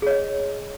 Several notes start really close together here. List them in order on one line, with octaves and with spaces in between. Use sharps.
G#4 C#5 D#5